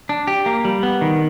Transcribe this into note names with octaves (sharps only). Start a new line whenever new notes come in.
D4
G4
A#3
G3
B3
D#3